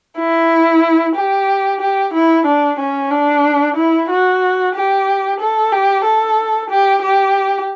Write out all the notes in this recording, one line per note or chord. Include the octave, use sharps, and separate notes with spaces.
E4
G4
G4
E4
D4
C#4
D4
E4
F#4
G4
A4
G4
A4
G4
G4